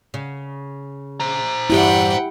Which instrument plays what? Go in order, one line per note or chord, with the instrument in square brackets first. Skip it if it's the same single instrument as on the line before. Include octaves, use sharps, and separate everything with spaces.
[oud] C#3
[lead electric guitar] C5 A#5
[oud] E2 G2 E3 [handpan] E4 G4 [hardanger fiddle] F#5 G5